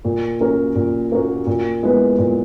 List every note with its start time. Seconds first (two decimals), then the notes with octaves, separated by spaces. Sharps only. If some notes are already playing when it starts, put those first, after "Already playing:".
0.05 A#2
0.40 A#3 C#4 F#4 A#4
0.75 A#2
1.12 A#3 C#4 F#4 A#4
1.46 A#2
1.83 G#3 B3 E4 B4
2.18 A#2